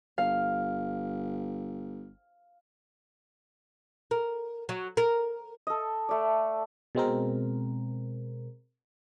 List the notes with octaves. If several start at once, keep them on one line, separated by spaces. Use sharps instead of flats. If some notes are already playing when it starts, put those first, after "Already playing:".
G1 F5
A#4
F#3
A#4
A4 D#5
A3 D5
B2 G#3 C4 A#4